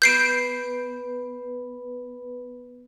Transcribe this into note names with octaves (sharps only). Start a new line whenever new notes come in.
B3 B4 G6 C7 D7